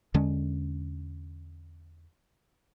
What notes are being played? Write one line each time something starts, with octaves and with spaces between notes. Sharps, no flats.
E2 D3 G#3 C#4